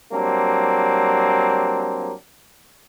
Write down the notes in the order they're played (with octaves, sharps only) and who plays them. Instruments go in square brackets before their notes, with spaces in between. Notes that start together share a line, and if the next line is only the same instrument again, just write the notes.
[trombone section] F#3 G3 A#3 C4 D4